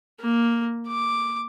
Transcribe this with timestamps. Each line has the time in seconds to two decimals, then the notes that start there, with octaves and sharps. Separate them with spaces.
0.20 A#3
0.87 D6